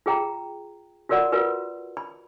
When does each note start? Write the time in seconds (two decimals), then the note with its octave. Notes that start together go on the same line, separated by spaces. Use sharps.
0.06 F4 G#4 G5 A#5
1.09 F4 F#4 A#4 D5 F#5
1.32 F4 F#4 A#4 B4
1.97 B5